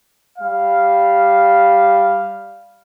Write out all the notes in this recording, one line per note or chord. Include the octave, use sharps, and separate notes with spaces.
G3 F5